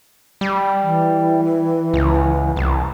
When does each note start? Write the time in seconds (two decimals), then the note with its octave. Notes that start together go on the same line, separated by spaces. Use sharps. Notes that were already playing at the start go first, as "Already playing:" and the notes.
0.41 G3
0.82 E3
1.94 C#2
2.56 C2